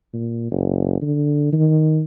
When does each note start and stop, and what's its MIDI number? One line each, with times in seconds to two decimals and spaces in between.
0.14 0.50 46
0.51 1.00 30
1.02 1.49 50
1.53 2.03 51